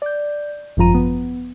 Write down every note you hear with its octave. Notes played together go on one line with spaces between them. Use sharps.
D5 G6
G#1 F#2 F3 F4 A#5 D#7
B3